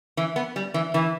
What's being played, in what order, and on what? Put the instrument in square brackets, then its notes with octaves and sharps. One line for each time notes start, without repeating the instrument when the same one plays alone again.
[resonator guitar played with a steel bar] E3
B3
G3
E3
E3